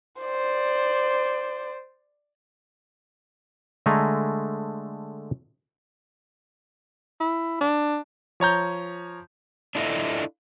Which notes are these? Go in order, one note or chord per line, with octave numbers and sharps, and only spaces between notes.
C5 D5
D3 G#3 A3 G#5 A#5
E4
D4
F3 C#5 A#5 G6
D4 E4 F4 A4 D#5 E5